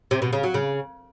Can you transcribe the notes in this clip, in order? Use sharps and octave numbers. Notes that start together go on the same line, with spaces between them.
C3
B2
C#3
F#3
C#3